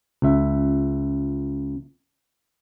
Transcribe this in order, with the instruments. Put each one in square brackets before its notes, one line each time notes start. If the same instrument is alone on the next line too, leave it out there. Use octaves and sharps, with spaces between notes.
[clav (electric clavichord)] C#2 E5